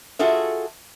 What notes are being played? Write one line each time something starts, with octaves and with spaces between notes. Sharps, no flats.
F4 F#4 G#4 A4 E5